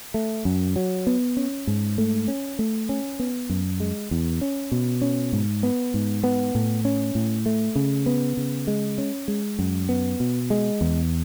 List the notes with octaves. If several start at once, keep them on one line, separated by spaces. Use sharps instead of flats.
A3
F#2
F#3
B3
C#4
G#2
A3
C#4
A3
C#4
B3
F#2
G#3
E2
C#4
B2
C#4
G#2
B3
G#2
B3
A2
C#4
A2
A3
C#3
B3
C#3
G#3
C#4
G#3
F#2
B3
B2
G#3
E2